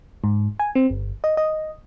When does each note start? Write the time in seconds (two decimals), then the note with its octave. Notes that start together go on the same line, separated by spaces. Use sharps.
0.24 G#2
0.59 G#5
0.75 C4
0.90 G1
1.24 D#5
1.37 D#5